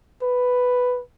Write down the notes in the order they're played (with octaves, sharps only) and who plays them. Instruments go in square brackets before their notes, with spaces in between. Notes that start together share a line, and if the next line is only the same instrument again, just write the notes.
[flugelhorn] B4